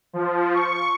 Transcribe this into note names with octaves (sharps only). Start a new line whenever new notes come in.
F3
C#6